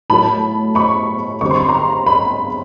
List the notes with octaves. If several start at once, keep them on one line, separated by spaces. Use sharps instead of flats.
A2 F#3 A3 A5 B5
B5 C#6
D3 G3 C4 C#6
C6
B5
A#5 C6
B5